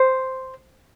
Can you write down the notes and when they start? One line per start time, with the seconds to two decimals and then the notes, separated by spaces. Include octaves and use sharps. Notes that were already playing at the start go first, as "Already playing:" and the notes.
Already playing: C5